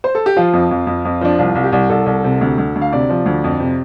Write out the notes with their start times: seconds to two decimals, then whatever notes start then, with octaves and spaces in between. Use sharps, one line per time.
0.04 C5
0.15 A4
0.26 G4
0.37 F3 F4
0.53 F2
0.71 F2
0.87 F2
1.05 F2
1.21 F3 D4
1.39 C2 F4
1.55 C2
1.64 G4
1.72 C2
1.90 C2 A4
2.06 C2
2.24 C3
2.41 D2
2.58 D2
2.75 D2
2.81 F5
2.92 C3 D5
3.09 F3
3.26 D2
3.44 F2
3.60 C3